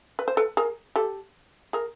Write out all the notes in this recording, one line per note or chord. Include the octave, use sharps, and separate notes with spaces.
B4
C5
A4 B4
G#4 A#4
G4 A4
G#4 A#4